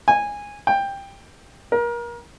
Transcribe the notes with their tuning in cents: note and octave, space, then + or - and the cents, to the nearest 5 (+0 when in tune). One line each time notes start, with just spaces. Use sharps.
G#5 -15
G5 +15
A#4 +30